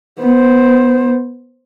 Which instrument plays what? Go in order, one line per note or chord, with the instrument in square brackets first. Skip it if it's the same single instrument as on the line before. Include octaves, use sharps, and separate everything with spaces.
[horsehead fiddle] B3 C5